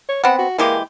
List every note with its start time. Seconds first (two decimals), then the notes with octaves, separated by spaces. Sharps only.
0.09 C#5
0.24 B3 C4 F#5
0.38 F#4
0.58 E3 G#3 A#3 G4